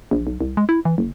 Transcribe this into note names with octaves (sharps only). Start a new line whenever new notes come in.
A#1
B1
C2
G#3
E4
E3
F#1